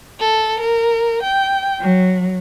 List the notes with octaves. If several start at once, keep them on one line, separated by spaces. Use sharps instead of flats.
A4
A#4
G5
F#3